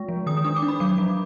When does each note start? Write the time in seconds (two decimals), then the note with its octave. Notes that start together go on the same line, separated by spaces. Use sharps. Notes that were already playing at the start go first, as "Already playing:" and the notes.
Already playing: G#3
0.09 F3
0.26 D#3 D#6
0.45 D4 D#6
0.56 D6
0.62 D4
0.68 B5
0.80 F#3 D6
0.98 F3